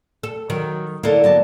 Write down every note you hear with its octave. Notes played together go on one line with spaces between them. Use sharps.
A4
D#3 F#3
D3 A#3 E4 A4 C#5
F#3 B3 A5